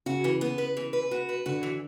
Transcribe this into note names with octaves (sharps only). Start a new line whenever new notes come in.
C#3 F#4
E3
B3
B4
E3
B4
F#4
B4
D3 F#4
E3